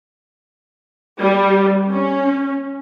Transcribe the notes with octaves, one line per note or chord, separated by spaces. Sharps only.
G3
C#4